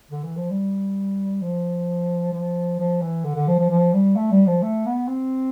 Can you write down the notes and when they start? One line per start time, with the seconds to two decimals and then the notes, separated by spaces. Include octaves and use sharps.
0.11 D3
0.24 E3
0.37 F3
0.51 G3
1.42 F3
2.33 F3
2.80 F3
3.02 E3
3.25 D3
3.36 D3
3.48 F3
3.59 F3
3.70 F3
3.93 G3
4.16 A3
4.32 G3
4.47 F3
4.63 A3
4.86 B3
5.08 C4